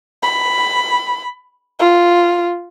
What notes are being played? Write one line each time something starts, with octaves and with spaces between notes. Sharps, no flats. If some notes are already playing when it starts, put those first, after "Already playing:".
B5
F4